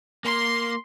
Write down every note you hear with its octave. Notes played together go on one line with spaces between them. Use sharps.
A#3 C6